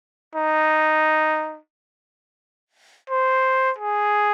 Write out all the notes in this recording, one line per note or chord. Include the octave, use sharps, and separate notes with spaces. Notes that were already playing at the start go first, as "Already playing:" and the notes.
D#4
C5
G#4